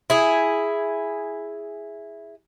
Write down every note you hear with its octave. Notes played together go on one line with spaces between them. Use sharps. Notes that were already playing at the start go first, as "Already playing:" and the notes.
E4 G#4